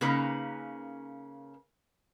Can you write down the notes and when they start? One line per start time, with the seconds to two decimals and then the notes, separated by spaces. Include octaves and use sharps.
0.01 C#3 A#3 C#4 D#4 A#4 B4